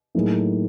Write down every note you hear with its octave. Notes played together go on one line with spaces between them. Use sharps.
A2 F#3 A#3 D#4 G#4